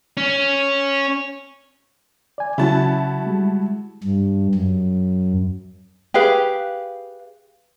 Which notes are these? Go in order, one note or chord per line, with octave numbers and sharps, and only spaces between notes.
C#4
D5 G#5
C#3 F#3 C#4 E4 F#4 A5
G3 G#3
G2
F#2
G4 G#4 B4 F5